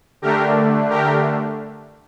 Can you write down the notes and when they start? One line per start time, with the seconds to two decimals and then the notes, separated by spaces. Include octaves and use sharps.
0.22 D3 A3 D4 G4 A#4
0.90 G4 A#4